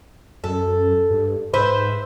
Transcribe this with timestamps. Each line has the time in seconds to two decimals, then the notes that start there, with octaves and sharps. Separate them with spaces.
0.44 F#2 A4
1.10 G2
1.54 G#2 B4 C5 E5